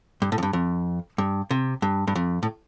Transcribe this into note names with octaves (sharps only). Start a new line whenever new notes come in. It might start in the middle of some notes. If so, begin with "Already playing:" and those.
G2
A2
F2
G2
F2
G2
C3
G2
G2
F2
A2